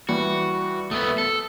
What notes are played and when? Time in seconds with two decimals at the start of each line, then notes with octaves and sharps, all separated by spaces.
0.09 E3 G3 F#4
0.91 A3 B3 D#6
1.18 A4